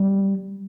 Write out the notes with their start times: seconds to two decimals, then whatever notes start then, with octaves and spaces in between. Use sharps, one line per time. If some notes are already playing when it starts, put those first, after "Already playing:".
Already playing: G3